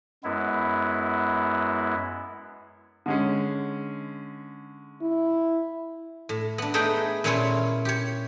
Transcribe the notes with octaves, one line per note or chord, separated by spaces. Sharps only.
F#2 G#3 B3 E4
D3 G#3 C#4
E4
A2
B3 D4
A3 D#4 G#4 B4 G5
A#2 A#3 C#4 E4 F4 C#5
G4 C#5